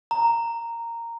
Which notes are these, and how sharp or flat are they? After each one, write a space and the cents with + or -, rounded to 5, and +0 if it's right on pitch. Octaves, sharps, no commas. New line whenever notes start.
A#5 -10